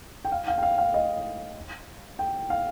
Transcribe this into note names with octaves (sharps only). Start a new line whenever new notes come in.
G5
F5
F5
G5
F5
F5
D#5
G5
F5